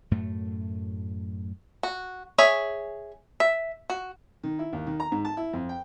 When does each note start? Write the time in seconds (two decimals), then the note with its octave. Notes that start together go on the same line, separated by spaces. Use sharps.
0.11 F#2 A2 A3
1.83 F#4
2.38 G#4 C#5 E5
3.40 E5
3.90 F#4
4.43 D#3
4.59 E4
4.73 D#2
4.87 D#3
5.00 A#5
5.12 G#2
5.25 A5
5.37 E4
5.53 F2
5.69 G5